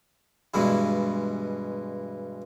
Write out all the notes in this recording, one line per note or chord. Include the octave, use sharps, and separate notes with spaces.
G2 B2 E3 G#3 E4